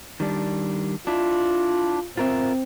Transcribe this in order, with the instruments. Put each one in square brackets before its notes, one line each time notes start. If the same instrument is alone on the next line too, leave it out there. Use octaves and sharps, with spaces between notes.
[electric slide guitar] D#3 G3 D4
[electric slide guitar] D4 E4 [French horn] F4
[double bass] C4 [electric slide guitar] F4 A#4 E5